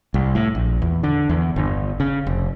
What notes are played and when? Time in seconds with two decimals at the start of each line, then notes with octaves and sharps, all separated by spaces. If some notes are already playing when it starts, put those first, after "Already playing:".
0.14 C2
0.35 A2
0.55 A#1
0.82 E2
1.03 D3
1.29 E2
1.56 G1
2.00 C#3
2.27 F1